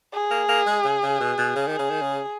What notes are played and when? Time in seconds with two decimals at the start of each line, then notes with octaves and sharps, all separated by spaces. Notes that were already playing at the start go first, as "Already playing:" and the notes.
0.13 G#4
0.31 A#3
0.49 A#3
0.67 G#3
0.84 C#3
1.03 C#3
1.20 B2
1.38 B2
1.56 C#3
1.67 D#3
1.74 G#4
1.79 C#3
1.90 D#3
2.02 C#3